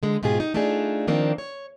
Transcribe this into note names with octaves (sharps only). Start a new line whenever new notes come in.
D3 G#3
G#2 B2 F4 G4 G#4
D#4
A3 D4 D#4 F4 G#4
D#3 F3 A#3 C4 D4
C#5